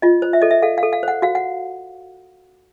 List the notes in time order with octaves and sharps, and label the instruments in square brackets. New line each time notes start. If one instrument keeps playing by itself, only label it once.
[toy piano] F4 D#5
C5
E5
A4 D#5
E5
A4 F5
F5
A4
F5
C5 F#5
F#4 F5
F#5